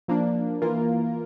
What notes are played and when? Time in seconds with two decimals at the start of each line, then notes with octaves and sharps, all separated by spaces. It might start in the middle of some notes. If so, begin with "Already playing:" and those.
0.08 F3 A#3 D4
0.62 E3 A#3 F4 A#4